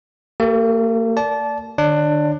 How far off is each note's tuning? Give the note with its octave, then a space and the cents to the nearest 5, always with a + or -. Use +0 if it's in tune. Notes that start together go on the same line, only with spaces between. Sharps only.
A#3 -45 G4 +5 A#4 +25
D5 -15 A5 -20
D3 +40 D4 +20 C#5 +0